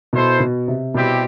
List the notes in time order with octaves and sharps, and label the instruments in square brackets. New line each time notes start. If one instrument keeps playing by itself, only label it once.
[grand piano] B2 [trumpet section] E4 A4 C5
[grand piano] B2
C3
[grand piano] B2 [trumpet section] G3 C4 E4 G4